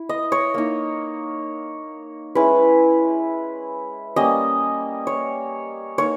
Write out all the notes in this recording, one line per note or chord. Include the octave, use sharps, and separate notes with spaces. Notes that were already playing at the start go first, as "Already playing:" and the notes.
Already playing: E4
D#5
C#5
A#3 D#4
G#3 C#4 E4 B4
G3 A#3 C#4 D#5
C#5
A#3 D#4 C#5